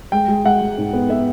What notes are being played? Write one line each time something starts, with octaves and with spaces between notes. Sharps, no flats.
G#3 G5
G#3
G#3 F#5
G#3
G#2
B3
B3 E5